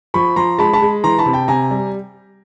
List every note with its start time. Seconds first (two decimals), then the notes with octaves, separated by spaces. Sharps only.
0.14 F3 B5 C#6
0.36 F3 A#5 C6
0.59 G#3 A5 B5
0.73 A5 B5
0.82 G#3
1.04 E3 A#5 C6
1.19 A5 B5
1.26 C3
1.33 G5 A5
1.48 C3 G#5 A#5
1.71 G3